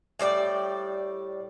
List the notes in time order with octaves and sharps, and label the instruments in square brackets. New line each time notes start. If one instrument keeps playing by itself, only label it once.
[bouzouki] A2 G3 D5 G5